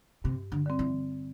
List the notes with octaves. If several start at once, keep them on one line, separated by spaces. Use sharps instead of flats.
G2 C3
D3
D3 G3 C4
E3